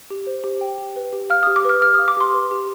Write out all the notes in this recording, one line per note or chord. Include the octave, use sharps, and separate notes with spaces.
G4
C5
G4
G5
G4
B4
G4
F5 F6
D#6
G4
D6
B4 F6
G4 F6
D#6
F5
D6
G4 C6
B4
G4